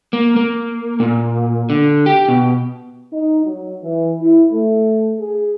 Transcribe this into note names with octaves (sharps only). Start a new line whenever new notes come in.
A#3
A#3
A#2
D3
G4
B2
D#4
F#3
E3
E4
A3
G#4